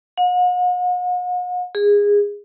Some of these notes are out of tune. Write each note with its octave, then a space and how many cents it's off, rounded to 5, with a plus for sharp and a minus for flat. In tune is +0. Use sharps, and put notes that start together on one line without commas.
F#5 -45
G#4 -20